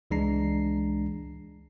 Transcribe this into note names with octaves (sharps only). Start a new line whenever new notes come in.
C#2 E3 G#3 D4 A#5 C7